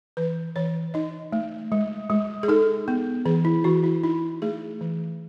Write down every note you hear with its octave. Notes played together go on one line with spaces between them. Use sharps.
E3 B4
E3 C#5
D#4 D#5
A3
G#3
G#3
G#4
D#4 A4
B3
E3 G#4
E4
E3 F#4
E4
D#4 E4
A3 G#4
E3